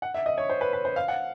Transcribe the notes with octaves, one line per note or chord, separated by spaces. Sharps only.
F#5
E5
D#5
C#5
C5
B4
B4
C5
F5
F#5